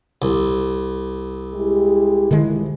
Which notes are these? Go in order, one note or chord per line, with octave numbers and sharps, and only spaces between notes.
C2
G#3 E4 G4
D3 D#3 F3 G#3 E4